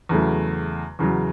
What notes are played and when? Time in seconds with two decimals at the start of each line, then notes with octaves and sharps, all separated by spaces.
0.09 E2 C#3 F#3 A3
0.99 E2 C#3 F#3